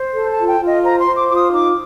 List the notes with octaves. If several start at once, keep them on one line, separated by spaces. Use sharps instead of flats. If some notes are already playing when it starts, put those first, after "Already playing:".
Already playing: C5
A4
A5
F4
G5
F4
D#5
C5 A#5
C6
C5
D6
F4 D6
D#6
D#4 D6